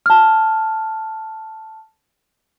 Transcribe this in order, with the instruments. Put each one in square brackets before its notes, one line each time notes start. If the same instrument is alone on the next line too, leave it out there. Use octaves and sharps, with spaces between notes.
[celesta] A5 F6